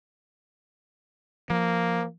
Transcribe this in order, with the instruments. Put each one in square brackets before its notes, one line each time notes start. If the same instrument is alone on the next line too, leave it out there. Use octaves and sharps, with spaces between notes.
[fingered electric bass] F3 [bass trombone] A#3